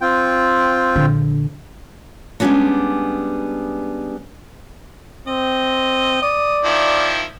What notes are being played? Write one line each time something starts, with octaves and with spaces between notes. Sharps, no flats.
C4 F4 G5
A#1 D3
G3 G#3 B3 C#4 D4 F#4
C4 D#5
D5 D#6
D#3 F3 E4